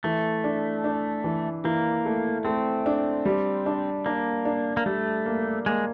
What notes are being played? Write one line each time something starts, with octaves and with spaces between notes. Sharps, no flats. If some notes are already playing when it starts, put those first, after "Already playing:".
E3 A3
D4
D4
E3
E3 A#3
A3
A3 C4
D4
G3
D4
A#3 D4
D4
A#3
G3 A3
A#3
G#3 A#3